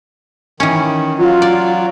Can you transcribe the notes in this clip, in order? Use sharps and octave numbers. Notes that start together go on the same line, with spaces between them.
D#3 E3 C#4
F#3 F4
D5